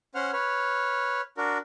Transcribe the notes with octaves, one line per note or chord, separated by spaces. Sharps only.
C#4 C5 F#5 F6
B4 C#5 F6
D4 F#4 A#4